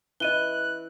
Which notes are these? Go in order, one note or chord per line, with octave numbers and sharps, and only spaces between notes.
E3 D#5 F#6 D#7 G7